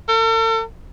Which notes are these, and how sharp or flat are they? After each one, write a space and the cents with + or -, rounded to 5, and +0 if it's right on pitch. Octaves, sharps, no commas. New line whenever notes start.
A4 +45